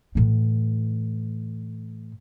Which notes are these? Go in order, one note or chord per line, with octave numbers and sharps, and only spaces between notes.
A2 E3